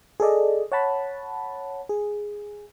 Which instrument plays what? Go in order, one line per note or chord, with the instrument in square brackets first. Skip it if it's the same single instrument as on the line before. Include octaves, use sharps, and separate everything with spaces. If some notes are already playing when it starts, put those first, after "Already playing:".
[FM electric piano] G#4 A4 D5 D#5
C#5 F#5 A5 B5
G#4